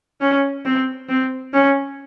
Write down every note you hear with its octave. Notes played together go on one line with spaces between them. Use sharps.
C#4
C4
C4
C#4